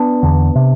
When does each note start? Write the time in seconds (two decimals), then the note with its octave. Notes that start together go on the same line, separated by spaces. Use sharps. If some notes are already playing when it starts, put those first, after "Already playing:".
Already playing: B3 D4
0.23 E2 D3
0.55 C3